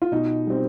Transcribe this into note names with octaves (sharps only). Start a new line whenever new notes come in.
F4
B2 D#4
G3 C4